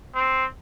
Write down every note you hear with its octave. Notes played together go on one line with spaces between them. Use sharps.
C4